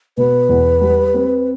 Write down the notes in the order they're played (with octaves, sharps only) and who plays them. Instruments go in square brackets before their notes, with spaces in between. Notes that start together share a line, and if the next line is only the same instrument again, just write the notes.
[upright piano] B2 [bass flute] B4
[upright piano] E2
G3
C4